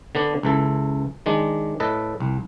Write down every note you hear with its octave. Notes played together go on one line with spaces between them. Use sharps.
D3 B3 D4
C#2 E3 A4
D#3 G#3 D4
A2 A4 B4 D#5
C2